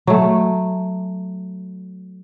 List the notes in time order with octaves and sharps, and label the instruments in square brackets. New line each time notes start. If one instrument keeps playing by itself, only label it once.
[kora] F#3 A3